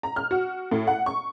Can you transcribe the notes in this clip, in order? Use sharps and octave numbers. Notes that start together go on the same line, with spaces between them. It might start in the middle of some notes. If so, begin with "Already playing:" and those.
A#5
F6
F#4
A2
F#5
C#6